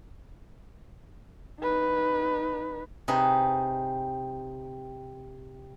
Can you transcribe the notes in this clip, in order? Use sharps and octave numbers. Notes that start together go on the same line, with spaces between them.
D#4 B4
C3 D#4 G#4 B4